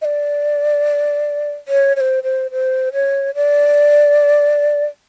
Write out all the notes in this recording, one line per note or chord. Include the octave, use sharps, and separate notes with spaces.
D#5
D5
C#5
C#5
C5
C5
C5
C#5
D5